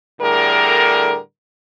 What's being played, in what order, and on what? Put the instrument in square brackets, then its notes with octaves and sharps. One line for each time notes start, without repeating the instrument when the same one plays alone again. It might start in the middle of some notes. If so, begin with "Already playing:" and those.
[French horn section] A2 D3 G3 G#4 A#4